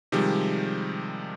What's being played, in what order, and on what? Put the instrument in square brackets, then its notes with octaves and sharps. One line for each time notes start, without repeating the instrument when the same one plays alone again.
[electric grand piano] C3 D#3 F3 G3 G#3